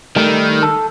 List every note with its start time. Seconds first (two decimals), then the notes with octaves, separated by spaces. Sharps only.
0.16 D#3 G3 A3
0.63 A4